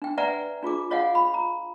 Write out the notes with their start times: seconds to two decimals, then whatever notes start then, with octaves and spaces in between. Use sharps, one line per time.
0.02 D4 G5
0.18 B4 D5 E5 F#5 G#5 A#5
0.63 D4 F4 G#4 D6
0.91 F4 C#5 D#5 F5 F#5 G#5
1.15 B5
1.34 A#5